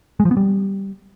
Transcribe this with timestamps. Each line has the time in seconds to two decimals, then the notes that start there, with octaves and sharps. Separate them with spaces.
0.20 G#3
0.25 F3
0.31 B3
0.37 G3